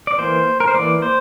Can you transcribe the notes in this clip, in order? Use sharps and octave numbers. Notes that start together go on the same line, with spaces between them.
D5
E3 A#3 C5
A#4
C5
E3 A#3 D5
C5